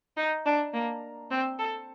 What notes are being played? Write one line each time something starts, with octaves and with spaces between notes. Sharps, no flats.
D#4
D4
A#3
C4
A4